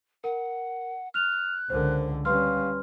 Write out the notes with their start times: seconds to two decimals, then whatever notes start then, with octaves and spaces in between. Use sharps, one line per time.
0.24 A#4 F#5
1.14 F6 F#6 F7
1.70 C#2 D3 A#4 C5
2.25 G3 C#4 B4 F5 C6 F6